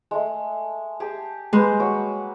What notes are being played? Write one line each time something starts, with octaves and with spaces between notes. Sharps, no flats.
G#3 A3
G4 G#4 A5
G#3 A#3 B4 C5
F#3 C#6